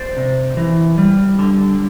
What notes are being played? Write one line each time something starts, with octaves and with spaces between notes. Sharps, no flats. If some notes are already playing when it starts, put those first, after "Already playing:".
Already playing: C5 D5
C3
E3
G3
D3